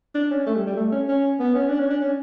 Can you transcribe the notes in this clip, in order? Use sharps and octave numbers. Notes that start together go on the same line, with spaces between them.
D4
C#4
A3
G3
G3
A3
C#4
C#4
B3
C#4
D4
C#4
D4
C#4